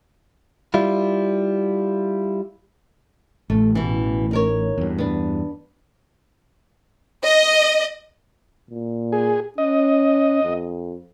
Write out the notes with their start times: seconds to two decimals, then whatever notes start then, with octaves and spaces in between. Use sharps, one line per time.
0.74 G3 E4 F4
3.50 A1 A3
3.75 B2 E3
4.31 D#4 A#4 C#5
4.78 E2 G2
4.98 B3 D4
7.24 D#5
8.70 A#2
9.12 G#4
9.58 C#4 D#5
10.44 F2